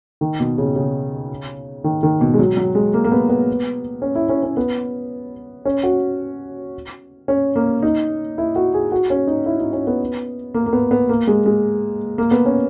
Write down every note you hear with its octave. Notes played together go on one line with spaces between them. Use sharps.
D#3
B2
C#3
C#3
D#3
D#3
B2
G#3
F#3
F#3
G#3
A#3
A#3
B3
B3
C#4
E4
C#4
C#4
B3
C#4
F#4
C#4
A#3
D#4
E4
F#4
G#4
F#4
C#4
D#4
E4
D#4
C#4
B3
A#3
A#3
B3
B3
A#3
G#3
G#3
A#3
B3
C#4